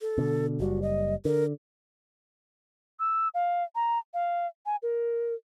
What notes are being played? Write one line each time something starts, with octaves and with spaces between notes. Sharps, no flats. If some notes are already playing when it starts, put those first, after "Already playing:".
A4
B2 D3
F#1 G3 F#4
D#5
D3 A#4
E6
F5
A#5
F5
G#5
A#4